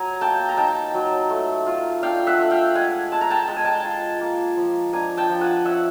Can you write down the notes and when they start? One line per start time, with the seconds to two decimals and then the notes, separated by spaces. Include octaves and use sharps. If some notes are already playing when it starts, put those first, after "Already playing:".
Already playing: F#3 G#5 A#5
0.21 A#3 G5 A5
0.49 A#5
0.57 D#4 G5 A5
0.94 F#3
1.30 A3
1.66 F4
2.03 D4 F5 G5
2.27 E5 F#5
2.39 A3
2.51 F5 G5
2.75 G#3 F#5 G#5
3.12 G#3 A5
3.21 A#5
3.30 G5 A5
3.48 G#3 A5
3.56 G#5
3.65 G5 A5
3.84 F4
4.21 A#3
4.57 F3
4.93 D4 G#5 A#5
5.17 G5 A5
5.29 F3
5.41 F#5 G#5
5.65 C#4 E5 F#5